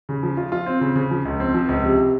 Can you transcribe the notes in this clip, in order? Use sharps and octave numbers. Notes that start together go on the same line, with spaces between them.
C#3
F3
F4
F4
C4
C#3
C#3
F3
C#2
C4
F3
C#2
C3